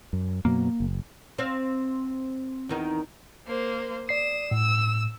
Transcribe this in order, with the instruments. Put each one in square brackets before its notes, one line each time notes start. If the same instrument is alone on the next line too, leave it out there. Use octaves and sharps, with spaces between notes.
[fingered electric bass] F#2
[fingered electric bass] F#2 B2 F#3 [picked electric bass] A#3
[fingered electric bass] F#1
[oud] C4 F5
E2 D#3 D#4
[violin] A#3 C5
[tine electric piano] D5 C7 [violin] D#6 E7
[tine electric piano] A2 [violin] E6